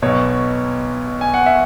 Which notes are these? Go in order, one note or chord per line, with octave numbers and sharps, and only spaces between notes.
B1 B2 C#5
G#5
F#5
E5